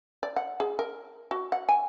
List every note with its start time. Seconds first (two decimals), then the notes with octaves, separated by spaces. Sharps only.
0.23 D5
0.36 F#5
0.60 G#4
0.79 A#4
1.31 F#4
1.52 F#5
1.69 G#5